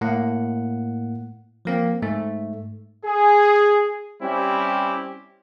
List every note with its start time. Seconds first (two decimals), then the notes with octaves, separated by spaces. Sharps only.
0.01 A2 A#3 F#5
1.65 F3 A#3 C4
2.02 G#2 A3
3.05 G#4
4.22 G3 C4 C#4 E4 G4